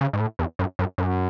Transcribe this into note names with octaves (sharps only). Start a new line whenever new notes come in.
C#3
G#2
A2
E2
F#2
F#2
F#2